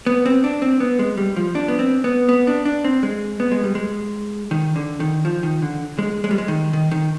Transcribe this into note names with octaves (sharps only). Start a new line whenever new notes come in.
B3
C4
D4
C4
B3
G#3
G3
F3
D4
B3
C4
B3
B3
D4
D4
C4
G#3
B3
G#3
G3
G#3
D#3
D3
D#3
F3
D#3
D3
G#3
G#3
G3
G#3
D#3
D#3
D#3